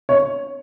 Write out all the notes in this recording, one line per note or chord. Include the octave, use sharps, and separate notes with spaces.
C#5